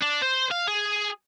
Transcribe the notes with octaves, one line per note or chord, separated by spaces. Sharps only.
D4
C5
F5
G#4